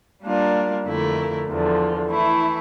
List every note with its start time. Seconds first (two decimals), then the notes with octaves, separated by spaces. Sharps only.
0.23 G3 A#3 D4 F4 A#4
0.86 F2 D3 A3 E4 A#4
1.48 E2 D3 F3
2.10 E3 A3 E4